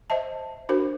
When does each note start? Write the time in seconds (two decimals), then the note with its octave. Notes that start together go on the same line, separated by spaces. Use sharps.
0.10 C5 D#5 E5 A5
0.69 D4 F#4 A#4 C5